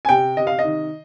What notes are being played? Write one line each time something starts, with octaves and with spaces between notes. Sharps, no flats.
G#5
C3 G5
C3 D#5
F5
D#5
D#3